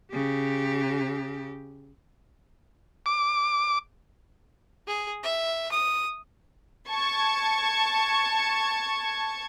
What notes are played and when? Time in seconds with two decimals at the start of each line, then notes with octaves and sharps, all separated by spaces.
0.12 C#3 G4
3.06 D6
4.87 G#4
5.23 E5
5.71 D#6
6.89 A5 C#6 G#6